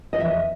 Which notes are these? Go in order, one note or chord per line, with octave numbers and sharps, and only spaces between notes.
D#5
E2 E5